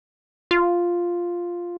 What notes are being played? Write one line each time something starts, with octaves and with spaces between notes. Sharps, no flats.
F4